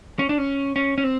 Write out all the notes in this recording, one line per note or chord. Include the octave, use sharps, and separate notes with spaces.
C#4
D4
C#4
C#4
C#4
C4